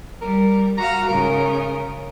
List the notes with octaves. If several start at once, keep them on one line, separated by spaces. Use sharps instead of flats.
G3 A#4
F#4 F5 A#5
G#2 C#3 A#4